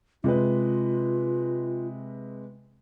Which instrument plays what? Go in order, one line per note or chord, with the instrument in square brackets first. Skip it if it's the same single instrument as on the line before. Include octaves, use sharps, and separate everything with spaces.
[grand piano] C3 G#3 B4 [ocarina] F4